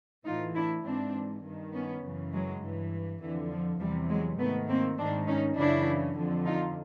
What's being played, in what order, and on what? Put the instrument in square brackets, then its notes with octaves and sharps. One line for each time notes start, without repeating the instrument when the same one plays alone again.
[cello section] A2 E3 D#4 F4
D4 E4
G#2 E3 C4 D4
G2 D#3
B3 C#4
F#2 C#3 E3
F#3 G#3
G2 E3
F2 D3 E3
F3
E2 C3 E3 F3 G3
F#3 G#3
G#2 D#3 A3 B3
A#3 C4
G#2 D#3 C4 D4
C#4 D#4
F#2 C#3 E3 D4 E4
F2 D3
D#4 F4